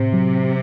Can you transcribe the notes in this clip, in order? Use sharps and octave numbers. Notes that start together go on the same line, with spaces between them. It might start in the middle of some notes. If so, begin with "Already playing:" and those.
Already playing: A2 C3
F#3